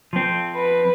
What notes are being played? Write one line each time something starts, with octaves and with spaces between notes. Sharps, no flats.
F3 C4
B4